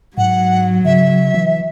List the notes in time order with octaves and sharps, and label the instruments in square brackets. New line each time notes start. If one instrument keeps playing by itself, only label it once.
[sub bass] G#2 [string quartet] F#3 [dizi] F#5
[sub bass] C#3 [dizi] E5
[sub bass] E3